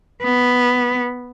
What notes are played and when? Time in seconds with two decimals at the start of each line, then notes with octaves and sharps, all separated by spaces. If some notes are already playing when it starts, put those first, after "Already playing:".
0.23 B3